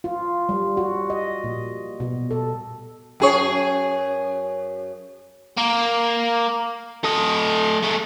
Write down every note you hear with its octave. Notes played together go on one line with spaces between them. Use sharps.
F4
G3
F#4
D#5
A#2
B2
A4
F#2 G#4 C#5
A#3
A3 D#5
G#3 A3